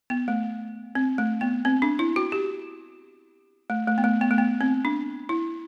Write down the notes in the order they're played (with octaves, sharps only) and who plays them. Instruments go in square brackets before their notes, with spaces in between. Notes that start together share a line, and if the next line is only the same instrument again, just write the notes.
[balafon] B3
A3
C4
A3
B3
C4
D4
E4
F#4
G4
A3
A3
B3
A3
B3
A3
B3
C4
D4
E4